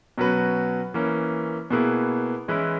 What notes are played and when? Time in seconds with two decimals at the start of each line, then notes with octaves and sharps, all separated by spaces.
0.18 B2 F#3 C#4 F#4 B4
0.94 E3 A#3 C#4
1.71 B2 A#3 E4 G#4 B4
2.48 E3 G#3 C#4 E4 B4